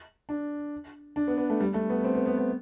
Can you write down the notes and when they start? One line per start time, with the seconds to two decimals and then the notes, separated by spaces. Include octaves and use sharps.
0.29 D4
1.16 D4
1.28 B3
1.38 B3
1.50 A3
1.61 G3
1.74 A3
1.90 B3
2.04 C4
2.15 B3
2.26 B3
2.37 B3